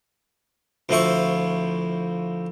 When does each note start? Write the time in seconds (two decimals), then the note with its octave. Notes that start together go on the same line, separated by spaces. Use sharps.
0.89 D2 F3 E4 C#6